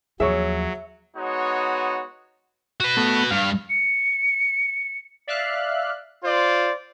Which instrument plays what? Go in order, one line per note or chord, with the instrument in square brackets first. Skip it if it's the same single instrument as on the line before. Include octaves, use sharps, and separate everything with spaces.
[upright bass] D#2 F3 [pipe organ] F#3 [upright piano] G#4 C#5 C#6 [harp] E5
[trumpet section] G#3 B3 D#4 F#4 C#5
[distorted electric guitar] F#4 B4
[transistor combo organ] A3 B3
[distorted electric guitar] G2 [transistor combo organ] F5
[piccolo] C#7
[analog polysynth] D5 E5 F5 F6 F#6
[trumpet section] F4 C5 D5